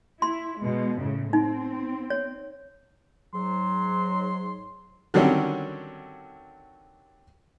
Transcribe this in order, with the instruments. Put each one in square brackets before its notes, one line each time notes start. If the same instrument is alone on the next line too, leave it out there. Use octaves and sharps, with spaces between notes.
[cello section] E4 [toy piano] C6
[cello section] B2 G#3
A2 C#3
[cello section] C4 [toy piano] D#4
[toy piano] C#5
[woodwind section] G#2 F#3 [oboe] C6
[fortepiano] D3 D#3 F#3 G3 C4 C#4